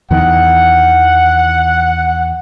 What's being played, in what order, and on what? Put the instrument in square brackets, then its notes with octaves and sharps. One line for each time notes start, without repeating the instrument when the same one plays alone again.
[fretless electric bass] E2 D#3 E3 [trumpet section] F#5